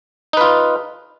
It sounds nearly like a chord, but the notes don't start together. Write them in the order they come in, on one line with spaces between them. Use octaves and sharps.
D#4 B4 F4